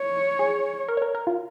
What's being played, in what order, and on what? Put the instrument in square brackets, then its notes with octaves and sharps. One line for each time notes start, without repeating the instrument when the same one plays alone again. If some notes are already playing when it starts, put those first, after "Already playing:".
Already playing: [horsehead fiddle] C#5
[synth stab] G#4
A#4
C#5
A#4
A#4
F4